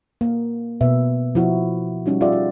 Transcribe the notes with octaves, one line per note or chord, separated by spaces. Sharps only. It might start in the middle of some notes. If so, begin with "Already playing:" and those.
A#3
B2 B4 E5
F3 E4 F#4
G3 C#4 D#4 F#4
F4 G#4 D5 E5 F#5
F4